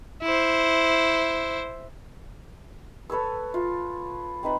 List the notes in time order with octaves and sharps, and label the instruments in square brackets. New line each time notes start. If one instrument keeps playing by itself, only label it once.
[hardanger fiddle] E4 C5
[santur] A4 B4 C#5 E6
F4
C4 D#4 B4 B5